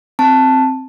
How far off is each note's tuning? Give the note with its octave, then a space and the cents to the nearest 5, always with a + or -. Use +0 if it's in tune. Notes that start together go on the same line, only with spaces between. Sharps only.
C4 +0 A5 +0